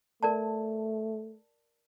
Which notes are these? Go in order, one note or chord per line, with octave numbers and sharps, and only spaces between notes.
A3 A#4 D5 A5